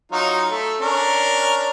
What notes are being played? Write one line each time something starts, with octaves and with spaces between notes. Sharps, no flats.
F#3 D#4 F4
A3
C#4 D4 A#4